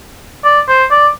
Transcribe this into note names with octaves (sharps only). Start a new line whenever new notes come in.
D5
C5
D5